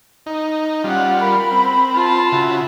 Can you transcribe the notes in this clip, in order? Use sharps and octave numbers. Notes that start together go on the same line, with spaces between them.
D#4
G3 C#4 F4 F#5
A#4 B5
C4
F4 A5
C#3 E4 F#4